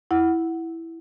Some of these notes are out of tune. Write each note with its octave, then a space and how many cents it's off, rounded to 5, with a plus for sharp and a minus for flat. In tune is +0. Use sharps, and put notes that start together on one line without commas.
E4 +0 F#5 +0